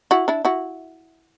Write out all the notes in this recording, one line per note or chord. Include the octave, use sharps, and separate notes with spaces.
E4 F#4
D4 E4
E4 F#4